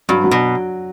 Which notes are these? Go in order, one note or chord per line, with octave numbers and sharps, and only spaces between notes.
G2 F#3
F#3
B2